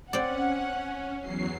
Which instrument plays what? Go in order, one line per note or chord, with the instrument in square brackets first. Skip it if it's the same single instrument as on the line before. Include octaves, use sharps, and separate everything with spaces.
[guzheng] C4 D5 [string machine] C#4 [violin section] F#5
[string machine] E2 F#3 C7